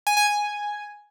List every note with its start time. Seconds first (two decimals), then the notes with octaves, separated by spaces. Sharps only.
0.07 G#5
0.17 G#5
0.27 G#5